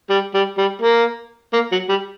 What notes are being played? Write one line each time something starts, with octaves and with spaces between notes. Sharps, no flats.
G3
G3
G3
A#3
A#3
F#3
G3